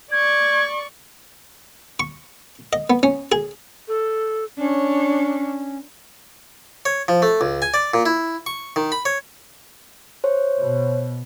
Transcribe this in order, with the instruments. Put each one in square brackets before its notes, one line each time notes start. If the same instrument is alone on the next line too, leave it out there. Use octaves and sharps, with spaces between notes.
[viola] D5 C#6 [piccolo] G#6
[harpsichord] C#6
D#5
B3
C#4
G#4
[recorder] A4
[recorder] C#4 [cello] D4 C#5
[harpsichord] C#5
F3
A3
C#2
G#5
D5
A#2
E4
C#6
D#3
B5
C#5
[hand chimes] C5 C#5
[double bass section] B2